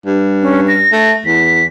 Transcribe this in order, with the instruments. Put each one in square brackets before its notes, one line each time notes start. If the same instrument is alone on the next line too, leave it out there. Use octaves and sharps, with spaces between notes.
[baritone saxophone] G2
[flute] C#4
A#6
[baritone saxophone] A3
[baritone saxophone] E2 [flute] B6